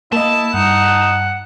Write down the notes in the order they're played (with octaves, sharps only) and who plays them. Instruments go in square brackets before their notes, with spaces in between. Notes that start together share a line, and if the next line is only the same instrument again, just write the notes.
[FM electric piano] A#3 D#5 [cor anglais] E4 [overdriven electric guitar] A5
[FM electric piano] G2 [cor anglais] D#4 [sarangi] F#5